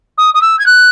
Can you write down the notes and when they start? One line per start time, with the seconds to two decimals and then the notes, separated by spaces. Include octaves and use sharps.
0.18 D#6
0.34 D#6
0.42 E6
0.59 G#6
0.66 F#6